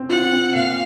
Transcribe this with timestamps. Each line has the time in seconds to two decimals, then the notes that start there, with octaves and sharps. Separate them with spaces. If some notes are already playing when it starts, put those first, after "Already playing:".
Already playing: C4
0.09 F4 F#5
0.32 C4
0.55 A#2 F5